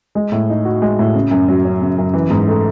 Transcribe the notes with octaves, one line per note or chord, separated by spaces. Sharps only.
G#3
A2
D#4
F#4
G#3
A2
C#3
F#2
F#3
C#4
C#3
F#2
E3
G#2
A3